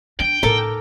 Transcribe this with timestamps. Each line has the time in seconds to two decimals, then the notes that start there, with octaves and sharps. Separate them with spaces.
0.20 D4 G5
0.43 A2 D#4 A4 A#4 D6